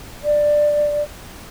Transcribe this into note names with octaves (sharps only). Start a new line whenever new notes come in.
D5